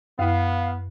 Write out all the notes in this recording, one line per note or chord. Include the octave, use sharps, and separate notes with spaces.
F#2 B3 E4 F5